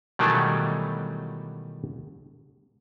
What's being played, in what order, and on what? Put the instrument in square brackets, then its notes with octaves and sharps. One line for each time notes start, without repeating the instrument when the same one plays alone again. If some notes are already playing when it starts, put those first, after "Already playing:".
[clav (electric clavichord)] B2 D#3 E3 F#3 G3 A3